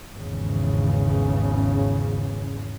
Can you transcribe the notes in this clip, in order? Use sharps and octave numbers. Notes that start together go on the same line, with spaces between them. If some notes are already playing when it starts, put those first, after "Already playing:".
G#1 E2 C#3